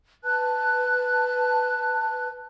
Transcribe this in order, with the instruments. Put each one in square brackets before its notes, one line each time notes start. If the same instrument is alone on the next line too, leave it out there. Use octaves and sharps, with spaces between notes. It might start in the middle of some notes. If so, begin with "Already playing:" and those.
[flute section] B4 A5 F#6